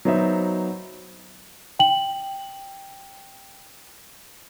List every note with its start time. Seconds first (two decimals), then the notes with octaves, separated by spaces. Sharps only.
0.05 F#3 B3 D#4 C5 E5
1.79 G5 F#7